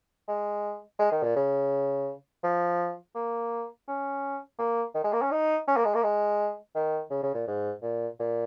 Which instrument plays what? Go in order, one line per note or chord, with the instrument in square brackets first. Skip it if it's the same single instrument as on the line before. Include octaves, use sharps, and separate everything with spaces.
[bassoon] G#3
G#3
D#3
A#2
C#3
F3
A#3
C#4
A#3
D#3
G#3
A#3
C#4
D#4
C#4
A#3
G#3
A#3
G#3
D#3
C#3
C#3
A#2
G#2
A#2
A#2